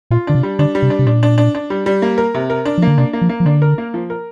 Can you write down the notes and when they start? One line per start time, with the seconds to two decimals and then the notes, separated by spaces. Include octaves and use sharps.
0.11 A#2 F4
0.27 D3 D4
0.35 C3
0.43 G3
0.59 D3 D4
0.75 G3
0.82 C3
0.90 D4
0.99 C3
1.06 A#2 D4
1.23 D4
1.38 D4
1.55 D4
1.70 G3
1.86 G3
2.02 A#3
2.18 A#4
2.35 C3
2.50 A#4
2.65 D4
2.78 F3 A#3
2.88 D3
2.98 C3 D4
3.13 A#3
3.22 F3
3.29 A#3
3.40 F3
3.45 D3 D4
3.62 A#4
3.78 A#3
3.94 F3
4.10 A#4